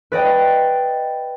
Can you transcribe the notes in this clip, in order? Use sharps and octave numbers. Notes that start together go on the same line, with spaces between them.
B4 D5 D#5 G5